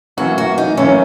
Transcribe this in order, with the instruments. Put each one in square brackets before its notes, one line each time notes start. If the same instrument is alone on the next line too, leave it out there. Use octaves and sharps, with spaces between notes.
[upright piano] F#2 E3 A#3 [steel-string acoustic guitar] F#4
[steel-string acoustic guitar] F#4
D#4
[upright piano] F#2 E3 A#3 [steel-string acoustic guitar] C#4